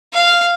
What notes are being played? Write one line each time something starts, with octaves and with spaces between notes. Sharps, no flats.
F5